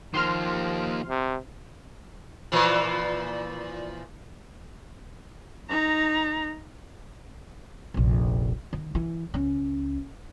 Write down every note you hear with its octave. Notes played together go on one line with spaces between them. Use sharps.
D#3 F3 A#3 C6 F6
C3
A#2 E3 F3
D#4 A#5
F1 A#1
D#3
E3
C#2 C#4